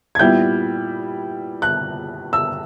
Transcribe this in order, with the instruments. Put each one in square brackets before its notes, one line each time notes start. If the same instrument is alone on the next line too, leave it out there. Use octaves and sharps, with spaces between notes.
[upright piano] G#6
A#2 G3 B3 E4 G6
F#6
E6